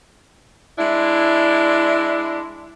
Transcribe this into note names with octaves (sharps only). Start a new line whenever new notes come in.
G#3 D4 E4